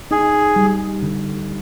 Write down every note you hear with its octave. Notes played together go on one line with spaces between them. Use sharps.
D#4 G#4
G3
D3